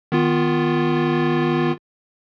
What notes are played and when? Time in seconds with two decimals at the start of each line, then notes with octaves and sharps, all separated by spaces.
0.12 D#3 B3 F4